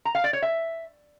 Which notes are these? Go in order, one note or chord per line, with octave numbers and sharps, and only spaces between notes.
A#5
F5
D5
C#5
E5